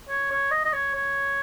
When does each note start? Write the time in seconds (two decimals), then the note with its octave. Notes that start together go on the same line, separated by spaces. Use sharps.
0.09 C#5
0.31 C#5
0.51 D#5
0.65 D#5
0.73 C#5
0.94 C#5